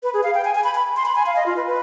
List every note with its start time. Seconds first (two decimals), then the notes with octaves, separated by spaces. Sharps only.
0.03 B4
0.14 G#4
0.23 F5
0.34 G5
0.45 G#5
0.55 G#5
0.64 B5
0.75 B5
0.96 C6
1.06 B5
1.16 G#5
1.26 F5
1.36 D#5
1.46 F4
1.57 B4
1.67 B4